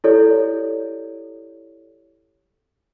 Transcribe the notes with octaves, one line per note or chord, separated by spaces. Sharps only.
E4 G4 A4 C#5 D5